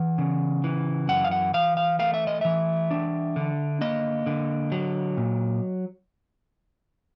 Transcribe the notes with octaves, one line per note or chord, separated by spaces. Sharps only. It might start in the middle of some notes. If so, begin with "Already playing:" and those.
Already playing: E3 F#5
C#3
E3
F#2 F#5
F5
F#5
E3 F5
F5
A3 F5
E5
D#5
E3 E5
D4
D3
A#3 D#5
D3
F#3
A#2